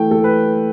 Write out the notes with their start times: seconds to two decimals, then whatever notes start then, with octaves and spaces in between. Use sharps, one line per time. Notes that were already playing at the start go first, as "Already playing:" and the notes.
Already playing: E3 A3 G5
0.11 A3 A4
0.24 B4